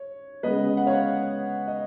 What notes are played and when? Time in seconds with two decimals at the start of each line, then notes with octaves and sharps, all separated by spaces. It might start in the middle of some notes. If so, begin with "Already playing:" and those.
Already playing: C#5
0.43 C#3 G#3 B3 B4 D#5
0.77 F#5
0.87 C#5 F5
1.68 D#5